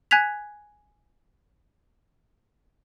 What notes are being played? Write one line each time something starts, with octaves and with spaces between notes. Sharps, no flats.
G#5 F#6 G#6 B6 F7